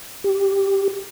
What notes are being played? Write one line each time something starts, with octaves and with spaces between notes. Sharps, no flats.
G4